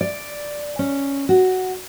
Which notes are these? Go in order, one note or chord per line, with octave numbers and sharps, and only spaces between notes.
D5
C#4
F#4